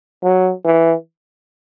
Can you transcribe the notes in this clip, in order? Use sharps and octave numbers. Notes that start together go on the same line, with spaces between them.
F#3
E3